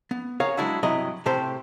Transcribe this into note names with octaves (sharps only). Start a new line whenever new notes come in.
B3
G#4 A#4 C#5 F5 F#5
F#3 G#3 D4 E4 F#4
G2 C3 F#3 E4 D#5
A2 C3 G4 A4 C5 G5